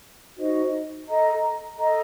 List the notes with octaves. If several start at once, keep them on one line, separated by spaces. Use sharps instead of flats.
D#4 F#4 C5 D#5
A4 D#5 A#5
A4 D#5 A#5